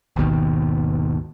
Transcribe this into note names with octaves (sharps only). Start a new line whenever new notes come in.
G#1 D#2 B2 D#3